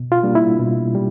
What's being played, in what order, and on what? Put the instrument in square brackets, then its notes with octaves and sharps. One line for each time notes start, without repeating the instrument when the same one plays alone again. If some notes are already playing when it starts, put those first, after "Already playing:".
Already playing: [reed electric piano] B2
F4
G3 A#3 D4
E4
B2
G3